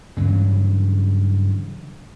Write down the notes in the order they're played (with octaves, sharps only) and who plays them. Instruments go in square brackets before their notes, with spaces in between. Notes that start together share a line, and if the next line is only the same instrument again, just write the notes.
[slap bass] G2 C#3 E3 F#3